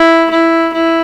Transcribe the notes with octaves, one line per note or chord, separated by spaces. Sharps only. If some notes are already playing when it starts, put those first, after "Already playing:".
Already playing: E4
E4
E4